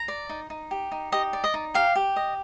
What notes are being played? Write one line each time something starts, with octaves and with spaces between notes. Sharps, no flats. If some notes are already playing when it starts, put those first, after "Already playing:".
Already playing: A#5
D5
D#4
D#4
G4
D#4
G4 D#5
D5
D#5
D#4
G4 F5
G4
D#5